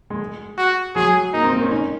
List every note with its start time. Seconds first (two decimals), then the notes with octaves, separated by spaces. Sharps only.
0.10 G#3
0.58 F#4
0.96 F#3 G#4
1.33 A#3 D#4
1.43 C4
1.53 A#3
1.62 C#4
1.71 D#4